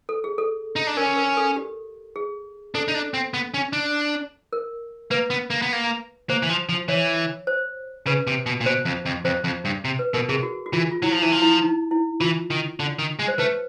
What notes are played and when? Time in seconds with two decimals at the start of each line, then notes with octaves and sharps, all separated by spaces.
0.09 A4
0.24 G#4
0.38 A4
0.76 D#4
0.87 D4
0.97 C#4 A#4
1.17 A#4
1.37 A4
1.56 G4
2.16 G#4
2.75 D4 A4
2.88 D#4
2.95 D4
3.14 C4
3.34 B3
3.54 C#4
3.73 D4
4.53 A#4
5.11 A#3 B4
5.30 B3
5.50 A#3
5.62 B3
5.73 A#3
6.29 A#3 C5
6.43 E3
6.49 F3
6.69 F3
6.88 E3 C#5
7.47 C5
8.06 C#3 B4
8.27 C3
8.46 B2
8.61 A#2
8.66 B2 C5
8.85 F2
9.06 F2
9.25 F2 C5
9.44 F2
9.65 G2
9.85 C3
9.99 B4
10.14 B2 A#4
10.29 C3 G#4
10.43 F#4
10.66 F#4
10.73 E3 F4
10.91 F4
11.02 F#3 E4
11.12 F3
11.22 E3 E4
11.32 F3
11.42 E4
11.62 D#4
11.91 E4
12.21 E3 F4
12.50 D#3
12.80 D3
12.99 D#3
13.19 G#3
13.28 C5
13.38 A3 B4